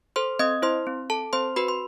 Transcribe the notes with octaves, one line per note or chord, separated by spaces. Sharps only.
A4 C5 C6
C4 D#5 D#6
E4 C5 C6
C4
A4 A5
C4 C5 C6
F#4 B4 B5
C6